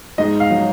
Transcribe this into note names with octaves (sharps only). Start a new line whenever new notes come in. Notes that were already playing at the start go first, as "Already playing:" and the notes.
G#2 D#5
F5
F#3